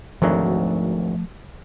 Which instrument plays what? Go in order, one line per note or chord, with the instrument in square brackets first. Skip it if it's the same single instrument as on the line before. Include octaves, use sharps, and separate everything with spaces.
[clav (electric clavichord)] G#1 D2 F#3 [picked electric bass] F3 A3